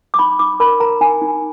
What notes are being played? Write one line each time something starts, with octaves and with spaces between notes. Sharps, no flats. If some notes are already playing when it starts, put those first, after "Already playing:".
D6
D#4 B5
D#4 D6
A#4 B5
A#4 A#5
D#4 G#5
D#4